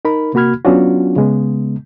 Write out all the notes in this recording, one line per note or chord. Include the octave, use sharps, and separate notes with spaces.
D#4 A#4 B5
C3 A#3 F#4 B5 F6 G#6
F#3 B3 C#4 D4 F4 F#4
C#3 G#3 B3